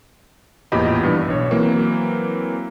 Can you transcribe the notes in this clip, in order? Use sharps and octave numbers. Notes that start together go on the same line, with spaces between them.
A1 E2 A#2 G4 D#5 B5
G2 E3
B1 C#5
E3 F#3 A#3 C4